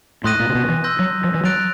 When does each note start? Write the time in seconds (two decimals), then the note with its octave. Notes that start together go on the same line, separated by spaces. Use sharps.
0.24 A2 C6 D#6 F#6 A#6 D#7
0.40 A#2
0.49 C3
0.55 B2
0.69 E3
0.84 C6 E6 G6 A#6
0.99 F#3
1.24 F3
1.34 E3
1.44 F#3 F#6 A6 D7 F7